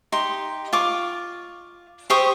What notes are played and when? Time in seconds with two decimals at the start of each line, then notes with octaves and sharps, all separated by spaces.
0.12 D#4 G4 C6
0.73 F4 C#6 D6
2.10 G4 C5 C#6 D#6